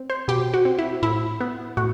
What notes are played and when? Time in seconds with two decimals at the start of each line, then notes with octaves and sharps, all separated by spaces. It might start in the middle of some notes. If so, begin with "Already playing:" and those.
Already playing: C4
0.10 C5
0.28 B2 G4
0.54 F#4
0.65 C4
0.79 E4
1.03 A2 E4
1.41 B3
1.77 A2 F#4